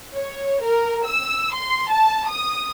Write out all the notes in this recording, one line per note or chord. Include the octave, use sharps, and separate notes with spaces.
C#5
A#4
E6
C6
A5
D#6